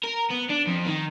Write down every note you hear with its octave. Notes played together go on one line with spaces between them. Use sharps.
A#4
B3
D4
F2
D#3